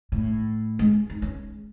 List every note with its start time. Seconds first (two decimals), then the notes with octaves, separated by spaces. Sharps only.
0.12 A2
0.79 G#3
1.10 D#4
1.22 C#4